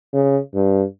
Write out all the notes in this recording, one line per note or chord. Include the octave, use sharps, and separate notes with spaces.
C#3
G2